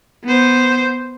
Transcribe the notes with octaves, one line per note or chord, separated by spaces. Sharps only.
B3 C5